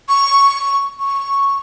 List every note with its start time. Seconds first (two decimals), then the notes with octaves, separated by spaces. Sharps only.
0.09 C#6
0.99 C#6